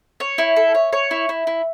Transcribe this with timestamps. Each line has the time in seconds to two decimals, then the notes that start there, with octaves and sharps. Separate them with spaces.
0.20 C#5
0.38 E4
0.56 A4
0.75 C#5
0.93 C#5
1.11 E4
1.29 E4
1.47 E4